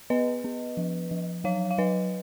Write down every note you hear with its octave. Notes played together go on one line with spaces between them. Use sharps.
B3 B4 D#5
B3
F3
F3
F#3 C#5 F5
F5
F#3 B4 D#5